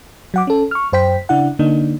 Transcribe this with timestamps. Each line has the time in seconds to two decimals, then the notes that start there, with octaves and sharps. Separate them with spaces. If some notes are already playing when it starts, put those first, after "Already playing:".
0.34 F#3 F#5 D6
0.47 C#4 A4
0.71 C#6 F6
0.93 F#2 C5 G5 B6
1.29 C#3 D4 E4 F#5
1.59 D3 A#3 D4 D#4